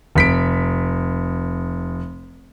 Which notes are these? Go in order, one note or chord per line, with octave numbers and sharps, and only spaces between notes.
F1 B6 D7